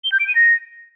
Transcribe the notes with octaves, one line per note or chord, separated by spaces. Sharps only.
G7
G6
D7
D#7
A#6